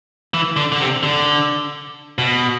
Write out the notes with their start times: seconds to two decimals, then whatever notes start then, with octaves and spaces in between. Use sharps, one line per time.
0.34 E3
0.56 D3
0.72 D3
0.80 C3
1.03 D3
2.18 B2